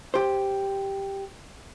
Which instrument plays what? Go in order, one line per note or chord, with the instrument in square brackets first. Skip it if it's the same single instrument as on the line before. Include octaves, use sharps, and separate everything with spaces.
[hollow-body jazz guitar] G4 C5